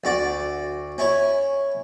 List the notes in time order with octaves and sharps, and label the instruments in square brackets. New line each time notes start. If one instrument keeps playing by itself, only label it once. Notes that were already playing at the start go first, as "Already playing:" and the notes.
[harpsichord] D2 F#4 D5
C#4 E4 C#5